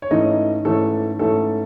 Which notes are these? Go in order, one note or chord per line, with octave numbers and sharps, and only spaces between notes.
C#5
G#2 E3 A3 C#4 D#4 D#5
G#2 E3 A3 C#4 A4
G#2 E3 A3 C#4 A4